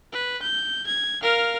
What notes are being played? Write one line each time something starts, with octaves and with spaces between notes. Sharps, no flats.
B4
G6
G#6
A#4 F5